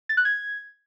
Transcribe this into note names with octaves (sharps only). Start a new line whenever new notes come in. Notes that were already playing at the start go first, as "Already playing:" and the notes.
A6
F#6
G#6